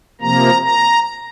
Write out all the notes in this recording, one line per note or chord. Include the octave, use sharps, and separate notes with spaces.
C3 F3 A#3 A#5
A#5